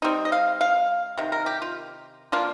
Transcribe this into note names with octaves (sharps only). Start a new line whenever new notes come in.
G3 C4 D#4
D#5
F5
F5
C3 D#3
A#4
G4
F4
F3 A#3 D4 F4